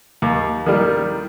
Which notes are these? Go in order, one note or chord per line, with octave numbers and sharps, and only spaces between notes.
D#2
D#3 G3